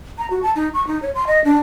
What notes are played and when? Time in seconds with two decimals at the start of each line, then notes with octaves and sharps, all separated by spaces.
0.18 A#5
0.30 F#4
0.43 A5
0.56 D#4
0.74 C#6
0.87 D#4
1.02 C#5
1.15 C6
1.27 D#5
1.44 D4